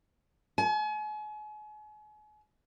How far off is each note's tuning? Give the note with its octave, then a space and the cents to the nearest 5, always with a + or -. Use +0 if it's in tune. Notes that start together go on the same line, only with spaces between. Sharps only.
G#5 +40